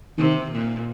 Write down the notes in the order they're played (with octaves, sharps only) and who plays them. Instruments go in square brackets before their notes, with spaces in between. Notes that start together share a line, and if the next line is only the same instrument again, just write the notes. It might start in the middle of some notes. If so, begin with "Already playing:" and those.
[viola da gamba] C3 [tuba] D#3
[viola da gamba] A#2